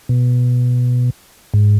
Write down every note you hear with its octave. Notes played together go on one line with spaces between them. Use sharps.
B2
G#2